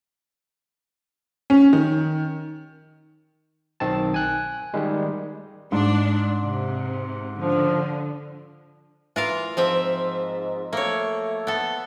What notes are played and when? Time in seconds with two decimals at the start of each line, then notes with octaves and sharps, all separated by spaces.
1.50 C#4
1.73 D#3
3.80 B1 D#3 C4 A5
4.14 G#5 F#6
4.74 D#3 G3 G#3
5.72 G#2 G#3 D4
6.42 C3
7.38 D3 F3
9.16 E3 F4 A#4 F5
9.57 G#2 F3 C4 E5
10.73 A3 A#3 C#5
11.47 B3 A4